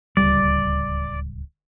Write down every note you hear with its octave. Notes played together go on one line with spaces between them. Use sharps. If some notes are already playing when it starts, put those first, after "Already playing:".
D1 C#2 G3 D5